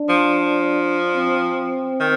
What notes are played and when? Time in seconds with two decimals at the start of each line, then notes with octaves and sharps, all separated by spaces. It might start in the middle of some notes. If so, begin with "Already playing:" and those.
Already playing: D4
0.09 F3
1.16 C4
2.00 D#3